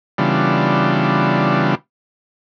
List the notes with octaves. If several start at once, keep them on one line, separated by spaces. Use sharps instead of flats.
C#3 E3 G3 B3 D4 F4